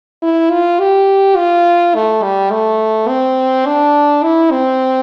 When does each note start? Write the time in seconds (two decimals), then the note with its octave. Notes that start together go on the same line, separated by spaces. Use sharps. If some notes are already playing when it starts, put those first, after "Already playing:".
0.22 E4
0.51 F4
0.80 G4
1.36 F4
1.95 A3
2.23 G3
2.51 A3
3.08 C4
3.66 D4
4.23 E4
4.51 C4